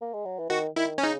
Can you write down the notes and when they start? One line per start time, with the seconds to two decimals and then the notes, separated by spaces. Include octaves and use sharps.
0.01 A#3
0.13 G#3
0.25 F#3
0.39 E3
0.49 D#3 F#4
0.76 D#3 E4
0.98 C#4
1.03 C#3 D#4